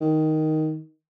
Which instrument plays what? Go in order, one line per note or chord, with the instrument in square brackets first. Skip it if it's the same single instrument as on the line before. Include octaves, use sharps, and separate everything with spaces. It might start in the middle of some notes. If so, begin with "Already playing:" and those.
[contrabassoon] D#3